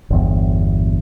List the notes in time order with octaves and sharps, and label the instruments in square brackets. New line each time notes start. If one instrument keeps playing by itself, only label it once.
[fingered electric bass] G1 E2